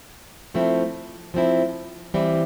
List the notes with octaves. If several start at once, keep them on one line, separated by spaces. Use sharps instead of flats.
F3 A3 C4 E4
F3 A3 C4 E4
E3 G3 C4 E4